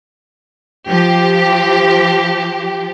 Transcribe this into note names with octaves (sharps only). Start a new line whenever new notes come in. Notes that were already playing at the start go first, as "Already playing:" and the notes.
F3 G4